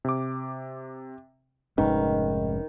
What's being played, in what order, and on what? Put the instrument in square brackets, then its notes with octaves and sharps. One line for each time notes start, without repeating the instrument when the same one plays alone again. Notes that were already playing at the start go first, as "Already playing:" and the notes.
[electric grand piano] C3 D6
[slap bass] F1 C#4 [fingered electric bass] G#2 [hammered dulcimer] D#3 [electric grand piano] B4